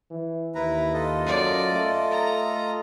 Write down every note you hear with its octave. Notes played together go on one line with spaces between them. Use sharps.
E3
D#2 E4 B4 A#5
F4 A4 D#5
F#2 D5
A3
A#5